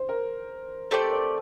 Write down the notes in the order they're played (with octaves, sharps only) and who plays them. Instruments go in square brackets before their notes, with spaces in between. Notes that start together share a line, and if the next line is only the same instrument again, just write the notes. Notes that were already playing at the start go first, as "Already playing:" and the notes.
Already playing: [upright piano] C5
A#4
[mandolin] A3 C4 G4 D5 [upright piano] C5
[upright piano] A#4
C5